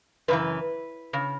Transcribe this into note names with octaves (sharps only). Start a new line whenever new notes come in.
F#2 C#3 E3 B4
C#3